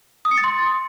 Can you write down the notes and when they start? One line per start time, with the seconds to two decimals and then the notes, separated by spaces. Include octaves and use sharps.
0.25 D#6
0.31 C#7
0.38 A6
0.44 C6